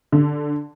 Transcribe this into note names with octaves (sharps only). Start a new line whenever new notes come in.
D3